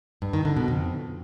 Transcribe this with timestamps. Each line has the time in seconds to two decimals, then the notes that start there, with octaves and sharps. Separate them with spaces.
0.22 G2
0.33 D#3
0.45 D3
0.57 B2
0.68 F2